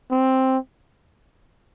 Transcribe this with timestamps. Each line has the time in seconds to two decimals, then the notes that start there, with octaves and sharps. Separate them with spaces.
0.11 C4